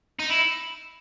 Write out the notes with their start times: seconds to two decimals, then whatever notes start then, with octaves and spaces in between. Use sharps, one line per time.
0.20 D#4
0.30 E4